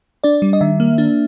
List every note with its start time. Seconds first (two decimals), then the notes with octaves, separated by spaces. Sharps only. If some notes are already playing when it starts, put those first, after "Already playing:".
0.24 D4 D5
0.42 G3
0.53 D#5
0.61 D#3 E5
0.80 A#3
0.98 D4